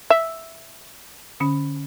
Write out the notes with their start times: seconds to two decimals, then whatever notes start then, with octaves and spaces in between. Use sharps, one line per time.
0.10 E5
1.40 D3 C#4